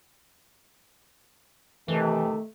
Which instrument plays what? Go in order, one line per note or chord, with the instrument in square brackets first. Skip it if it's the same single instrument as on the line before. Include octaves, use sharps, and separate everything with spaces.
[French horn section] C3 D#3 [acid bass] E3 [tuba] A3